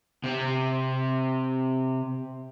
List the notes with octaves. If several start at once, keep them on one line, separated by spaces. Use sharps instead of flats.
C3 C4